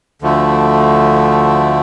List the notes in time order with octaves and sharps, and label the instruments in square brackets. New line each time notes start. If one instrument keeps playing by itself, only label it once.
[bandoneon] D2 D3 F3 A3